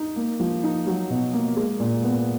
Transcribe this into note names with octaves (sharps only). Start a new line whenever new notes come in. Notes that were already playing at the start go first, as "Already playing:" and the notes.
Already playing: D#4
A#3
F3
D#4
F#3
B2
A#3
G#3
A#2
B3